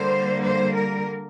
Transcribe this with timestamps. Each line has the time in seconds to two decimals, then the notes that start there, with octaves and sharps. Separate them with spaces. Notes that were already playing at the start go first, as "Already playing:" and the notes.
Already playing: D3 G3 A#3 C5
0.44 C5
0.76 A#4